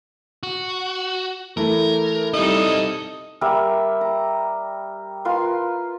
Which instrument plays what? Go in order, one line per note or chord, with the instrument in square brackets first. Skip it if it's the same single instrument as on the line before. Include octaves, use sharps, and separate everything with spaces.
[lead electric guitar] F#4
[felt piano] E3 A3 [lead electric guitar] A#4
[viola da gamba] G3 D#4 A4 [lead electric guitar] C4 E4 [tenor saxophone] D#5
[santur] G3 A#4 E5 F#5
A#5
F4 A#4 B4 C6